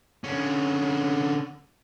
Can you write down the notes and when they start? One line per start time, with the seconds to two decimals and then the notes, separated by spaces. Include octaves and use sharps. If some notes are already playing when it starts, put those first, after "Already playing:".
0.24 D3 C#4